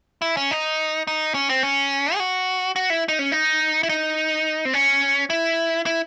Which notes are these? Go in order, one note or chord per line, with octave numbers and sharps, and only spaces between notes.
E4
C#4
D#4
D#4
C#4
C4
C#4
G#4
F#4
F#4
E4
D#4
C#4
D#4
E4
D#4
C4
C#4
E4
E4